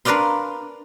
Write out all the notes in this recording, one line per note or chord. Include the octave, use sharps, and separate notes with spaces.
D4 A#4 B4 D5 F5 C6